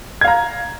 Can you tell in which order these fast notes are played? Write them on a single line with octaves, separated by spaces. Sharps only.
G#6 F5 A#5